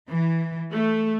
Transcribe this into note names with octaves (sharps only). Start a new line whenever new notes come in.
E3
A3